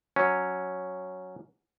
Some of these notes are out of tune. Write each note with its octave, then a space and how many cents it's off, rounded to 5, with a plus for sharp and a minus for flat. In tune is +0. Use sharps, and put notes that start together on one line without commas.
F#3 -5 C#4 +0